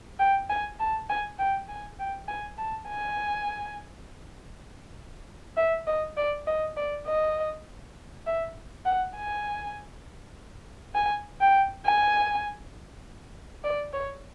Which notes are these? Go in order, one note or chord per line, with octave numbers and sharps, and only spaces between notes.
G5
G#5
A5
G#5
G5
G#5
G5
G#5
A5
G#5
E5
D#5
D5
D#5
D5
D#5
E5
F#5
G#5
G#5
G5
G#5
D5
C#5